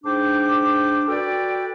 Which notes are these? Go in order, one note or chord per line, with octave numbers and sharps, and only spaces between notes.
G#2 D4 C5 G5 D6
F#4 A4 B4 D5 G5